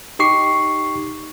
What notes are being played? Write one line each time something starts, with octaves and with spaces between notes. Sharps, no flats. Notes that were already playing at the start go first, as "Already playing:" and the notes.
D#4 G4 C#6 D6 C7